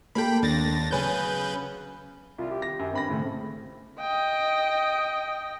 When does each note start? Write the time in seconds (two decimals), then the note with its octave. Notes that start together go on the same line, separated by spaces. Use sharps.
0.15 A#3 G4 A4 G5 B5
0.42 D#2 D4 A6 A#6
0.91 C#3 F#3 B3 B4 G#5 G6
2.38 C2 F4
2.51 G4
2.62 A#6
2.79 F#2
2.93 G2 C4 B5 A#6
3.08 A2 C#3 A3
4.00 D#5 G5